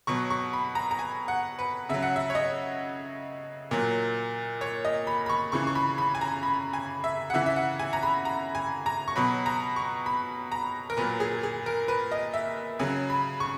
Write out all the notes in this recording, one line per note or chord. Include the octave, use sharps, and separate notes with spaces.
B2 F#3 C#6
C#6
B5
A#5
A#5
G#5
F#5
B4
C#3 F#3 E5
F#5
E5
C#5
D#5
A#2 F#3
C#5
D#5
B5
B5
C#6
C#3 E3 C#6
C#6
B5
B5
G#5
A#5
B5
G#5
E5
F#5
C#3 E3 E5
E5
F#5
G#5
A#5
B5
A#5
G#5
A#5
C#6
B2 F#3 B5
A#5
C#6
B5
A#5
A#4
A#2 F#3 B4
G#4
G#4
A#4
B4
D#5
E5
C#3 F#3 G#5
B5
C#6